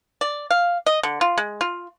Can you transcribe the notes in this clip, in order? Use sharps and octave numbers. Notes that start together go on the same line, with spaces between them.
D5
F5
D#5
D3
F4
G#3
F4